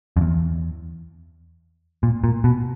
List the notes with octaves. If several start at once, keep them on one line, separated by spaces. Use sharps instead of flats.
F2
E2
A#2
A#2
B2